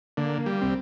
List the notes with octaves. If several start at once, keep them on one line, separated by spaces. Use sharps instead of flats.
D3 A#3
G3
C2 C4